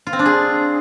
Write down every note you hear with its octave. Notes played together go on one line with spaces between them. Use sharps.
F4
C4
D4
G#4